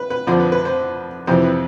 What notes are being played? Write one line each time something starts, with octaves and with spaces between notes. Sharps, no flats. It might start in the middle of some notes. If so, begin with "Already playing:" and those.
Already playing: B4
B4
F2 D3 F3 C5
B4
B4
C5
F2 C3 E3 C5
B4